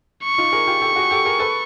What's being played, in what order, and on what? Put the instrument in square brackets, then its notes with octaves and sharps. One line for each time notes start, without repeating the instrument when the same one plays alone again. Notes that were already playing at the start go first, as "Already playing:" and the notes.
[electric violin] C#6
[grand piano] D#4 F4
G#4 A#4
F4 G4
G4 A4
F#4 G#4
G4 A4
G#4 A#4
A4 B4